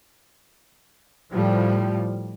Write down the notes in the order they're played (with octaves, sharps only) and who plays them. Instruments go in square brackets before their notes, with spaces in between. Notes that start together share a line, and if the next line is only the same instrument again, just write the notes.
[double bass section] A2 F3 G3